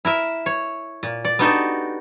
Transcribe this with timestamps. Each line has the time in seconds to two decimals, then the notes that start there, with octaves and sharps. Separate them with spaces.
0.05 E4 A#4 E5
0.46 C#5
1.03 A#2
1.25 D5
1.39 B3 D4 D#4 F#4 G4 A4